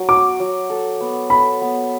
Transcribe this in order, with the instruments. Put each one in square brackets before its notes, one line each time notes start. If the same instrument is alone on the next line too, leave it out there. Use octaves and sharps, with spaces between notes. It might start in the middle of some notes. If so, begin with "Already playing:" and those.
Already playing: [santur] F#3
[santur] F#4 [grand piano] D6
[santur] F#3
A4
B3
[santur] A4 [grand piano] B5
[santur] B3